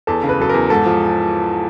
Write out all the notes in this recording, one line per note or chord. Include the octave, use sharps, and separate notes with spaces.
E2 A4
C#3
B4
F#3 A4
E2 A#4
G#2 A4
F3